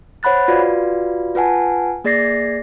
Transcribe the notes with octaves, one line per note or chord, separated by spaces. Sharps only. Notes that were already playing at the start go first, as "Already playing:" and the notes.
C5 C#5 F#5 B5 F#6 A6
F4 F#4 B4 D5 F5
F4 B4 F#5 G#5 A5
A#3 G#4 D5 A6 A#6 C7